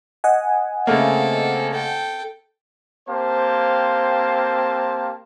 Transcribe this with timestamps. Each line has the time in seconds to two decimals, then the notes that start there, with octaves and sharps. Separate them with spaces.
0.24 D#5 F#5 G#5
0.87 C#3 A3 A#3 C4 A4
1.72 A4 G5
3.08 A#3 C4 G4 C5 F5 A5